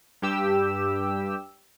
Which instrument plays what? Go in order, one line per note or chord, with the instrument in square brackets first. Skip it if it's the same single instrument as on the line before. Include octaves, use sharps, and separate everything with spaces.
[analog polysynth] G2 G4 E6